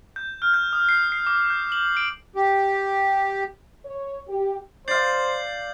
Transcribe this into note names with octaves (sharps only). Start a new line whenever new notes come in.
G6
F6
G6
D#6
C7
C7
D6
G6
F#7
D7
G4
C#5
G4
C5 D5 F5 G6 C7 F#7